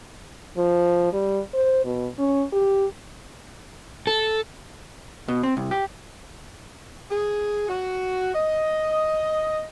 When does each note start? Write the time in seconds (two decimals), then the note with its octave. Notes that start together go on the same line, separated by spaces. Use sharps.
0.58 F3
1.13 G3
1.53 C5
1.85 B2
2.19 C#4
2.53 G4
4.07 A4
5.28 B2
5.43 C4
5.57 C2
5.71 G4
7.11 G#4
7.69 F#4
8.35 D#5